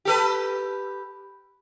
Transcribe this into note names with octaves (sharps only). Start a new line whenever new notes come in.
G4 A4 B4